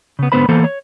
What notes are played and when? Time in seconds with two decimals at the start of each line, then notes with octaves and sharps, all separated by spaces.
0.19 C#3 B3
0.32 G#2 D3 B3 B4 C5 B5
0.49 E3 A#3 B3 A4 C5
0.64 C#5